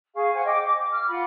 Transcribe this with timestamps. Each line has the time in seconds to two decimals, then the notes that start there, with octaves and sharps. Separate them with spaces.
0.15 G#4 F5 C#6
0.33 C5 F5 F#5 G#5
0.46 D#5 G5 D6
0.64 D6
0.91 F6
1.08 F4 F#5 B5